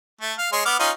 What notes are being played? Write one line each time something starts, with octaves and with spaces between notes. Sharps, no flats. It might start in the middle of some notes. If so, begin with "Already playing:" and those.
A3
F5
G#3 C#5 C6
B3 D6 F6
C#4 D#4 F4